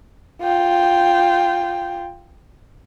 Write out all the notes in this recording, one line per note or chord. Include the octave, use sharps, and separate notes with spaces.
F4 G5